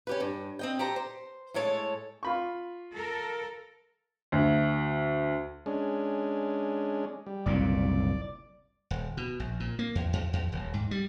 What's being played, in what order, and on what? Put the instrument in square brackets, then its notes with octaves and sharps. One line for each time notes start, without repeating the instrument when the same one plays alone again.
[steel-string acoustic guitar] C#4 G4 B4
G2
C4 D#5 G5
G4 A4 C5 A#5
C5
A2 G#3 A4 C#5 A5
[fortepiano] F4 B5 C#6
[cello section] A4 A#4
[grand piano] D2
[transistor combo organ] G#3 C#4 D4
G3
[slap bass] F#1 C2 A#2 [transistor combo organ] D5
[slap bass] D#1
B2
A#1
A#2
A#3
E2
E2
E2
D#1
G#2
G3